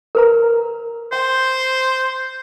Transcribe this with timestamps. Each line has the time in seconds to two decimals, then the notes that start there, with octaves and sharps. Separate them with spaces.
0.15 A#4 B4 A#5
1.13 C5 G5